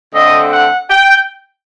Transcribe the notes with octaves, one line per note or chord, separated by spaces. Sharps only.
D3 A3 C4 D#5
F#5
G5